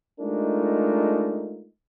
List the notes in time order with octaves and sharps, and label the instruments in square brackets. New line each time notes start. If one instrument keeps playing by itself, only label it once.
[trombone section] G#3 A3 D4 D#4 F4 A#4